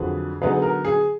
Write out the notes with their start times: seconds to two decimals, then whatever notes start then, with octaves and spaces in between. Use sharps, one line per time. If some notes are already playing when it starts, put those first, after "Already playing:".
Already playing: F2 D3 F#3 G#4 B4
0.42 D3 F#3 B3 D#4 G#4 B4
0.62 A#4
0.85 G#4